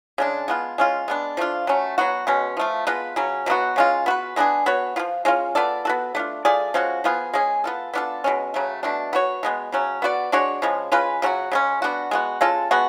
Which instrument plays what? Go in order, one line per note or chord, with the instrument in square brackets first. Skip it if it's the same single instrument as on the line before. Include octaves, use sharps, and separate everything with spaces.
[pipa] C#3 G#3 D4
G#3 B3 F4
G#3 C#4 F4
G#3 B3 D4
F3 A3 D4 F4
F#3 A3 C#4
F#3 B3 F#4
B2 G#3 C#4
F3 A3 F4
G#3 B3 F4 B4
C#3 F#3 C#4
B2 F#3 B3 F#4
C#3 G#3 C#4 F4
B3 F#4 B4
G#3 B3 D4 G#4
B3 F#4 C#5
F3 B3 F4
G#3 C#4 F4
B3 F4 A4 D5
B3 F#4 A4
A3 D4 F4
A3 F4 G#4 D5
F3 G#3 C#4 F#4
F3 B3 F4 G#4
G#3 C#4 G#4
B3 F4 A4
B3 D4 F4 A4
B2 G#3 C#4
C#3 F#3 A3
B2 A3 D4
B3 F#4 C#5
B2 G#3 B3
C#3 F#3 C#4
B3 F#4 B4 D5
G#3 D4 F#4 C#5
C#3 F3 G#3
G#3 C#4 F4 B4
C#3 F#3 C#4 F#4
C#3 G#3 C#4
B3 D4 F#4
G#3 B3 F#4
G#3 C#4 F4 A4
G#3 B3 F#4